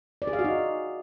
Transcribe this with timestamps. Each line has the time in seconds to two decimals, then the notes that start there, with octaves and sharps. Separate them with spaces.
0.22 D5
0.27 G#4
0.33 F5
0.39 F#4
0.44 D#4